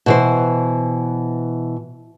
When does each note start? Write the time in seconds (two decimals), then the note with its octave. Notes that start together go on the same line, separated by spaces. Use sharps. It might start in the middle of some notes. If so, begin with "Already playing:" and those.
0.06 B2 E3 C5